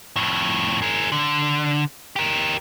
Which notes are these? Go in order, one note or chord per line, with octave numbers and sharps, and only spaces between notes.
F2 A2
G#4 A#4
D3
G4 A#4